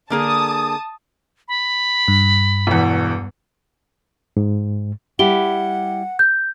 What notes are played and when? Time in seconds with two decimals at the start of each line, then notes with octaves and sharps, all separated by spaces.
0.10 D3 A#3 G#4 A5 D#6
1.48 B5
2.08 G2
2.67 E1 E2
4.37 G#2
5.19 G3 E4 G4 F#5 G7
6.19 G6